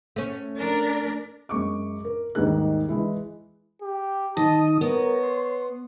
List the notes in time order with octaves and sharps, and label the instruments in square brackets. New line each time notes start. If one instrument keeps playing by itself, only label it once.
[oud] A3 C#4
[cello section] D4 A#4
[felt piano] F#2 G#3 C#6 D6
A#4
D#2 G#2 G3 D#4 G#4 F#6
E3 G#3 E4
[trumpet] G4
[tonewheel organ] D#3 D#4 D#6 [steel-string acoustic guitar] D#5 [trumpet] A5
[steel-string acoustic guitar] B3 [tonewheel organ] A#4 [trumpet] C#5
[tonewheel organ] C6